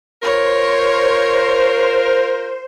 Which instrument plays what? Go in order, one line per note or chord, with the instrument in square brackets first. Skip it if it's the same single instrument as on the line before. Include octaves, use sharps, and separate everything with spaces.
[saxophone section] F4 A#4 [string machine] C5 [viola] C#5